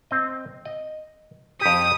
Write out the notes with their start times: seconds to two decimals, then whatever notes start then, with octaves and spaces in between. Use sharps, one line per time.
0.11 C4 D#5
0.65 D#5
1.61 F2 G4 D#6